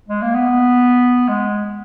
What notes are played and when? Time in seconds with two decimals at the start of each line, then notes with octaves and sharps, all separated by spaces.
0.09 G#3
0.22 A#3
0.35 B3
1.28 G#3